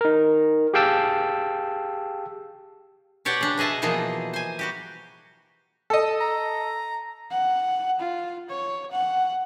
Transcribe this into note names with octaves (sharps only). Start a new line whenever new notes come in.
D#4 A#4
G4 G#4 F5 G5 A5 E6
B2 G4 C#5 D5 F#5 G5
C#3 D4
B2 G#4 D#5 E5 A5
B2 E3 F3 A#3 G#4 D#5
C5 G#5
G3 F#4 G4
A4 D#5
A#5
F#5
F4
C#5
F#5